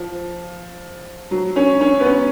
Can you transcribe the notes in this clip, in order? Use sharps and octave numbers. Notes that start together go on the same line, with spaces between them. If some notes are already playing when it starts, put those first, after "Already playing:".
Already playing: F3
F#3
C#4
C#4
B3
C#4